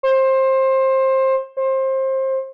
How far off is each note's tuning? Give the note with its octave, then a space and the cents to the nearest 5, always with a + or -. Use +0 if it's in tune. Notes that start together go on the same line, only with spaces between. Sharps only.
C5 +20
C5 +25